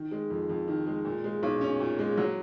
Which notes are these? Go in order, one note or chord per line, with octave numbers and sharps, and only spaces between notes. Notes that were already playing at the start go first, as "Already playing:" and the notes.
Already playing: D#3
G#3
F2
F2
D#3
G#3
A#2
G#3
B1
C#4
A#2
G#3
F#3